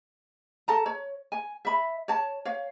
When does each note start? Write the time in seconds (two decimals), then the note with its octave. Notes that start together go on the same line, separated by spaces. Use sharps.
0.68 A4 A5 A#5
0.86 C#5
1.32 G#5
1.65 E5 B5
2.08 C#5 A5
2.45 C#5 F5